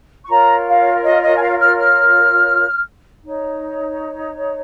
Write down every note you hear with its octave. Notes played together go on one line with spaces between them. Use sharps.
C#6
F4 A#4 C#5 A#5
F5
D#5
D#5
G#5
F5
F6
F6
D#4 C#5